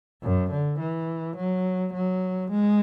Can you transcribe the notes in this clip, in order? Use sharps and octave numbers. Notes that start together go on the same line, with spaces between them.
F#2
D3
E3
F#3
F#3
G#3